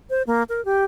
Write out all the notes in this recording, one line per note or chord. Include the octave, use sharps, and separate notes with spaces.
C5
A#3
A#4
G4